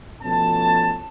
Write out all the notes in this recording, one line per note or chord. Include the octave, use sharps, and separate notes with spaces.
B2 F3 A3 C#4 A5